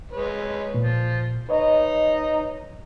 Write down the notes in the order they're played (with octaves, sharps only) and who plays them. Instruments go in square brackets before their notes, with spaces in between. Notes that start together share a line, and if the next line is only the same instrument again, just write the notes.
[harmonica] G#3 B4 C#5
[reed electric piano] A#2 [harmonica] F3
[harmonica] D#4 [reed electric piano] B4 C#5 D#5